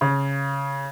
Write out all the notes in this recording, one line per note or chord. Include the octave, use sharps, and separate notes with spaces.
C#3